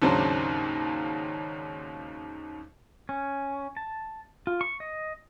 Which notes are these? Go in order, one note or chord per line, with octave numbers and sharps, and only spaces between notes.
D#2 G#2 C#3 F#3 C4 D4
C#4
A5
F4
C#6
D#5